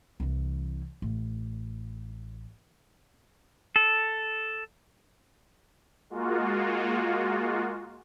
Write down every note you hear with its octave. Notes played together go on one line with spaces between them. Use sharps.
C2 E3
A1
A4
G#3 A#3 F4 F#4